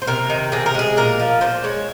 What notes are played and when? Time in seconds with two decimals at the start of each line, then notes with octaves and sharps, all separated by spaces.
0.02 C5
0.07 C3 A#4
0.30 D#3
0.52 C3 G#4
0.66 A#4
0.75 G#3 G#4
0.97 A#2 A#4
1.20 F3
1.41 A#2 C5
1.64 G#3 C#5